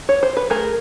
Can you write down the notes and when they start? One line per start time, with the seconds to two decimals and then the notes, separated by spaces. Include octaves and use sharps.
0.09 C#5
0.23 C5
0.37 B4
0.50 A3 G#4 A#4